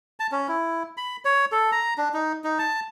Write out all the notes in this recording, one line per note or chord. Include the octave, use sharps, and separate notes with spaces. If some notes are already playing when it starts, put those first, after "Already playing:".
A5
C#4
E4
B5
C#5
A4
A#5
D4
D#4
D#4
A5